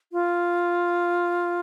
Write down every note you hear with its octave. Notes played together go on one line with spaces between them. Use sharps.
F4